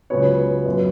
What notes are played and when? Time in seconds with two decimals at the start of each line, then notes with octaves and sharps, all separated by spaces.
0.10 C#2 C#3 F#3 B3 C#5
0.66 F#2 F#3 B3